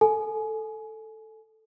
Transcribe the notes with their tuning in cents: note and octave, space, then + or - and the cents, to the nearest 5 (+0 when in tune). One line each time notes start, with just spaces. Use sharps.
A4 +0 G#5 +25